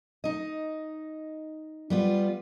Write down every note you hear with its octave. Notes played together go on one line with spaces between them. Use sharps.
D#4 D#5
G3 B3 F4